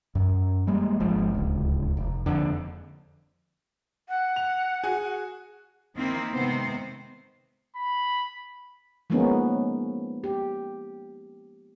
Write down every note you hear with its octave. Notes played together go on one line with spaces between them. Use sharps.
F#2
G3 G#3 A#3
G#1 G#2 F3
D1 C#2
F1
F2 D3
F#5
F7
F#4 G#4 G#5
D#3 A#3 C4 D#4 E4
G#2 C3 D#3 B3 C4 C5
B5
F3 G#3 A#3 B3 C#4 D#4
G4